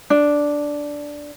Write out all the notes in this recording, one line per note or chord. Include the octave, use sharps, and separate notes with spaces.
D4